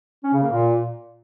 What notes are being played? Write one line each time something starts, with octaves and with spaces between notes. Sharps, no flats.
C#4
C#3
A#3
A#2